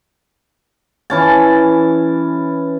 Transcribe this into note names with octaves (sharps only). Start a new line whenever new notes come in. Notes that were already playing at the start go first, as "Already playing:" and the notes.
E3 C#4 A5